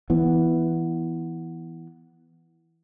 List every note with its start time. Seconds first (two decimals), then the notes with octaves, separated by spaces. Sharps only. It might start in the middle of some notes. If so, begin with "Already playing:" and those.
0.10 E3 B3